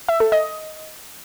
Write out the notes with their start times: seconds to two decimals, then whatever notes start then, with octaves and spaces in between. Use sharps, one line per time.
0.09 E5
0.20 A4
0.32 D#5